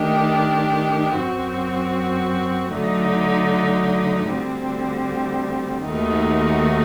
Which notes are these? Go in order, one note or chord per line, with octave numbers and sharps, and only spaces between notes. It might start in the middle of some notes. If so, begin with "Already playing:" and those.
Already playing: D#3 A3 D4 G4
F#2 F#3 C4 F#4
D3 F#3 A3 D#4
D2 D3 G3 C4
D#2 D#3 A3 D#4 F#4